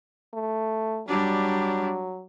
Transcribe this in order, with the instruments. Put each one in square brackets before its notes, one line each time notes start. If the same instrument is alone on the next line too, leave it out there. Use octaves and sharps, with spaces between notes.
[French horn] A3
[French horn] F#3 [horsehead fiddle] G3 D4